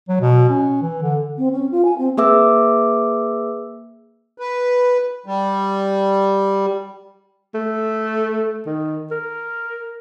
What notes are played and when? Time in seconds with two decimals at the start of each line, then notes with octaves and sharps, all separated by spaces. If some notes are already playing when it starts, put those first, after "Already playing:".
0.09 F#3
0.21 B2
0.50 C#4
0.82 E3
1.03 D3
1.37 C4
1.51 C#4
1.71 F4
1.84 G#5
1.98 C4
2.17 A#3 G#4 B4 E5 D6 E6
4.38 B4
5.26 G3
7.54 A3
8.66 D#3
9.11 A#4